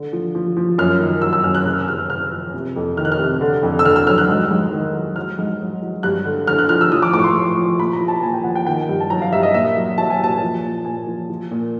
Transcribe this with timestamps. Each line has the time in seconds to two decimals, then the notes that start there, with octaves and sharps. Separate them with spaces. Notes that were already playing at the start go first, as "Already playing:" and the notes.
Already playing: D3
0.13 F3
0.35 F3
0.57 F3
0.78 F#2 F6
1.00 D#3
1.22 F#3 E6
1.33 E6
1.44 F#2 F6
1.55 F#6
1.66 C#3 F#6
1.73 F6
1.81 E6
1.88 F#2 F6
2.09 C#3 F6
2.32 F3
2.54 C3
2.76 F2
2.97 D#3 F6
3.05 F#6
3.12 F6
3.19 C3
3.41 D3
3.63 F2
3.79 E6
3.85 D3 F6
3.96 E6
4.07 F#3 F6
4.18 F#6
4.28 G#2
4.51 G#2
4.72 D#3
4.95 F#3
5.16 F#3 F6
5.39 G#2
5.60 F#3
5.82 F#3
6.03 G2 F#6
6.25 D3
6.47 D3 F6
6.59 F#6
6.69 F3 F6
6.81 E6
6.92 F3 D#6
7.02 D6
7.13 A2 D6
7.19 C#6
7.24 C6
7.35 F3
7.57 F3
7.79 A#2 B5
7.93 A#5
8.00 F3
8.08 A5
8.23 A#2 G#5
8.34 G5
8.44 F3 F#5
8.55 G5
8.67 D#3 G5
8.89 G2
9.00 A5
9.10 F#3 A#5
9.22 F5
9.32 G2 E5
9.43 D#5
9.54 A#2 E5
9.75 F#3
9.98 F#3 A5
10.10 G#5
10.19 A#2 A5
10.42 F3
10.63 A#2
10.85 A#2 G#5
11.07 F3
11.30 F3
11.51 A#2